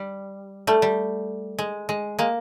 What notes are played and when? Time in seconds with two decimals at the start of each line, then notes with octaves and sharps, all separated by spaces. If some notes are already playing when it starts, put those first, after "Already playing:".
Already playing: G3
0.67 G3 A3
0.82 G3
1.59 G#3
1.89 G#3
2.19 G#3 A#3